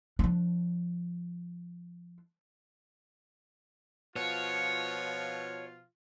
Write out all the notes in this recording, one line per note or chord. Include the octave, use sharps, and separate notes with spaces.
F3 D4
B2 F3 F4 C#5